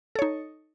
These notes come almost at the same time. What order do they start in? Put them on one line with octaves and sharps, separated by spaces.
A4 C#5 D#4